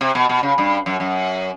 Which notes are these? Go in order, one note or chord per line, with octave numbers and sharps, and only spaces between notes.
C3
B2
B2
C#3
G2
F#2
F#2